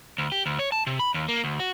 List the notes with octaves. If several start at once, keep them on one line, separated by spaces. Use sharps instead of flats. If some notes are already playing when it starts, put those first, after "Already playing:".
D2
G4
D2
C#5
A5
C3
B5
D#2
A#3
D2
F#4